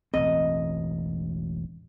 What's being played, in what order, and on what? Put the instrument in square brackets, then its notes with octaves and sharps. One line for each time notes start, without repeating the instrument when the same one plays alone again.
[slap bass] E1 A1 C4 [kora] D#5